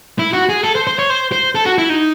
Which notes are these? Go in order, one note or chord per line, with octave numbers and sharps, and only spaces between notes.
E4
F#4
G#4
A4
C5
C5
C#5
C5
C5
A4
F#4
E4
D#4